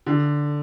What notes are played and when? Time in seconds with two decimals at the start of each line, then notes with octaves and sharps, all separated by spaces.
0.06 D3